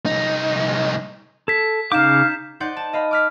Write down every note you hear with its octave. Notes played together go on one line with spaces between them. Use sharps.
C2 D#4
A4 G#6 B6
C#3 D#4 F5 D6 G6 E7
D#4 C5 D5 F#5 G6
A5
D#5 F5 B5
D6 F6 B6